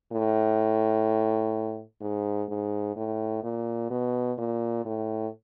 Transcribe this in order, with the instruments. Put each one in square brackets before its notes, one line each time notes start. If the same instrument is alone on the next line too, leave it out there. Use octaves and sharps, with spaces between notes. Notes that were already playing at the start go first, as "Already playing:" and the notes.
[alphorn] A2
G#2
G#2
A2
A#2
B2
A#2
A2